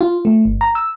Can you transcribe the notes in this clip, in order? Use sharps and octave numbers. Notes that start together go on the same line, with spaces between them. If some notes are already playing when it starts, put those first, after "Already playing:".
F4
A3
G1
A#5
E6